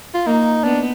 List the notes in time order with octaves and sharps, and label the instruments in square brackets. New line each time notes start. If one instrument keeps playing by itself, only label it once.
[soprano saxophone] F4
[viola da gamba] A#3 [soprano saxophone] D#4
[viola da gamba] B3 [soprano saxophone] D4